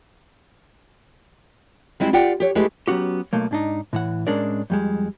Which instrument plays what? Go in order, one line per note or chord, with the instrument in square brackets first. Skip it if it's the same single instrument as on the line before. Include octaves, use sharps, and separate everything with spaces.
[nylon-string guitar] G3 G#3 C4 E4
F4 G4 D5 F#5 G5
G4 C#5
G#3 A3 E4 G4 G#4 B4
[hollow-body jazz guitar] F#3 B3 C#4 F#4 G4
B1 A3 A#3
G#2 D4 D#4
A2 E3 F#5
A2 G#3 C#4 D4 A#4 D5
F2 G3 G#3